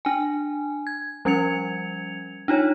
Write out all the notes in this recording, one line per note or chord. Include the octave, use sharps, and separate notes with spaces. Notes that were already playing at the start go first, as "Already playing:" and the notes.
D4 G#5
G#6
F3 G3 C#4 G#6 C#7 F7
D4 D#4 F4 C#5